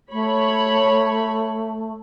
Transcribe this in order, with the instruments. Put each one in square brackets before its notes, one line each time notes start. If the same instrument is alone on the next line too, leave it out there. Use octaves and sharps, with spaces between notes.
[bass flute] A3 [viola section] C#5 B5